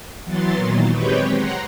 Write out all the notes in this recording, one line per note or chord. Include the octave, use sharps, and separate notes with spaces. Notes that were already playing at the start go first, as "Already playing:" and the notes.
E3 F#3 B3 C6 A6
A#2 D#3 F#3
G#3 C4 G4 B4 C#5 G5
F#5 A#5 C6